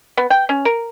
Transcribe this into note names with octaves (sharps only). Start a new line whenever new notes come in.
B3
G5
C#4
A#4